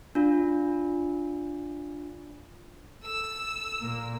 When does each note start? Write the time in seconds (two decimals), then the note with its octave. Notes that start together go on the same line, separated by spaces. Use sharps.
0.15 D4 F4
3.04 A4 E6
3.80 A#2 A#3 A#4